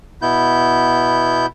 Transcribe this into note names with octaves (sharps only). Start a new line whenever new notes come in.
B2 B3 E4 G6